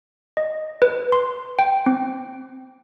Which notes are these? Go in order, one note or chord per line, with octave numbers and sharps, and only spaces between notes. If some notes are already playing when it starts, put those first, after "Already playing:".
D#5
B4
C6
G5
C4